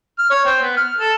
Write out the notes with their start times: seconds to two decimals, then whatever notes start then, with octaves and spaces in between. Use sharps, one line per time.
0.18 F6
0.30 C#5
0.45 C4
0.61 B3
0.77 F6
0.98 A4